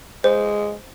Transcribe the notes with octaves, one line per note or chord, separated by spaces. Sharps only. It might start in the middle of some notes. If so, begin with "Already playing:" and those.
G#3 C5